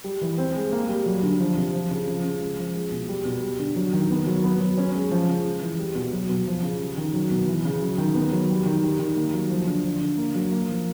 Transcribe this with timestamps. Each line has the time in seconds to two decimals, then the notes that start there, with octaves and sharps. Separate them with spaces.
0.04 G3
0.21 E3
0.38 C4
0.55 G#3
0.72 A#3
0.89 G3
1.06 F#3
1.23 D3
1.40 F3
1.57 C3
1.73 F3
1.91 C#3
2.07 F3
2.24 C#3
2.41 G#3
2.58 F3
2.75 G#3
2.91 B2
3.09 G3
3.25 B2
3.43 G3
3.59 D3
3.76 F#3
3.93 D#3
4.10 B3
4.27 F#3
4.44 B3
4.60 F#3
4.77 C#4
4.95 G#3
5.11 F3
5.28 C#3
5.45 G#3
5.62 E3
5.79 G3
5.95 B2
6.13 F#3
6.29 B2
6.47 F3
6.63 C#3
6.80 G3
6.97 D#3
7.13 F#3
7.31 B2
7.48 E3
7.65 C#3
7.81 F#3
7.98 D#3
8.15 B3
8.32 F#3
8.50 G3
8.66 D#3
8.83 G3
8.99 D#3
9.16 A#3
9.34 F#3
9.50 F3
9.67 D3
9.84 F3
10.01 D3
10.17 A#3
10.35 F#3
10.51 A#3
10.69 F3